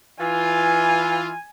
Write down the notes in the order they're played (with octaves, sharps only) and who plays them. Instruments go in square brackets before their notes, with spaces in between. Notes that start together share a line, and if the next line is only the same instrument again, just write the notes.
[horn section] E3 F4 [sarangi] G#5